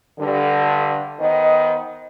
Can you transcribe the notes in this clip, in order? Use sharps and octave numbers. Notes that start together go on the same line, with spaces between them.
G2 D3
D#3 B3 C5 D#5